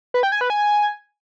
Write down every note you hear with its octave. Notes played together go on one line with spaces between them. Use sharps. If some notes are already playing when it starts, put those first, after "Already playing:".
B4
G5
G#5
B4
G#5